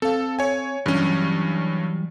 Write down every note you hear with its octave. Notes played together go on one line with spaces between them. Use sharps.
C4 A4 F5
C#5 G#5
G2 E3 F#3 G3 C#4